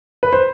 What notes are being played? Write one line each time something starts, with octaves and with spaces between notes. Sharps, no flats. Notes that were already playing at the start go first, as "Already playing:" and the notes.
B4
C5